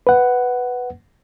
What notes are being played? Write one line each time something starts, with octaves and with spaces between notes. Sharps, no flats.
B4 F#5